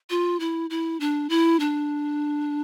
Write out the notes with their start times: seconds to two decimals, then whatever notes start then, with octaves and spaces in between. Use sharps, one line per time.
0.10 F4
0.40 E4
0.70 E4
1.00 D4
1.30 E4
1.60 D4